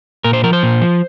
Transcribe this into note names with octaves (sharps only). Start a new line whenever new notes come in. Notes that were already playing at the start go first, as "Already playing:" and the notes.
A#2 A#4
C5
F3 A#4
C5
A#2
F3